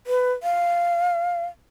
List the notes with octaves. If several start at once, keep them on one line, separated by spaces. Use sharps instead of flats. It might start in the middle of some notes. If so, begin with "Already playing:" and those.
B4
F5